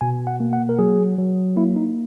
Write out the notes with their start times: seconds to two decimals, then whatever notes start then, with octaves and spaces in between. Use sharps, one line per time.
0.01 B2 G#5
0.27 F#5
0.40 A#3
0.53 F#5
0.69 A#4
0.79 F#3 G#4
1.18 F#3
1.57 A#3 E4
1.76 D#4